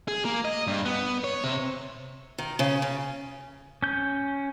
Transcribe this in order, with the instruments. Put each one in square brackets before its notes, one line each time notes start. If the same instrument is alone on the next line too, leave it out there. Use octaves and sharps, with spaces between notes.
[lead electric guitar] G#4
A#3
D#5
G2
B3
C#5
C3
[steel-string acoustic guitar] D#3
C#3
C#3
[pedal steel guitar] C#4 G6